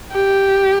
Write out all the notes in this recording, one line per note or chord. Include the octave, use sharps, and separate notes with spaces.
G4